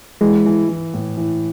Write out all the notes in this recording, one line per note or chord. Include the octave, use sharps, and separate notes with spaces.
E3 G#3
E3
E3
A2
E3